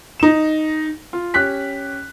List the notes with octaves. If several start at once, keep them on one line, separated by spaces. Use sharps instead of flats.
D#4 E7
F4
C#4 G4 F#6 B6